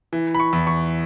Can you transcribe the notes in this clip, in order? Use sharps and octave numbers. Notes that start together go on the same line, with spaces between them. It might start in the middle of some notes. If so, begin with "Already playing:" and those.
E3
B5
C#6
E2
C#6